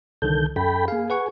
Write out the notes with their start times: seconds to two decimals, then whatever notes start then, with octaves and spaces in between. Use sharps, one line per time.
0.22 C2 D3 D#3 A4 G6
0.56 F#2 A4 G5 B5
0.88 A#3 G#4 F5
1.10 B4 F#5 C#6